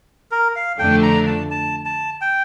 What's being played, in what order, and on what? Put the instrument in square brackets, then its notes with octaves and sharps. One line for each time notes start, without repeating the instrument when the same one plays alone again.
[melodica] A#4
F5
[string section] F2 D3 A3 D4 [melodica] G5
[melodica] A#5
A5
A5
A5
G5